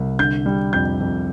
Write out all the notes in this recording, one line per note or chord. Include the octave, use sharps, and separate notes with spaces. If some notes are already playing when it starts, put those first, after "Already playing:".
Already playing: C2
D3 G6
G3
F2 G6
F2